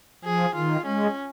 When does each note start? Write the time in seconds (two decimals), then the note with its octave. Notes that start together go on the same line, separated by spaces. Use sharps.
0.25 F3 G#4
0.55 D#3 F4
0.86 G#3 C#4